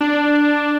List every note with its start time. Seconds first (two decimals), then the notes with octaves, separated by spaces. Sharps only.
0.01 D4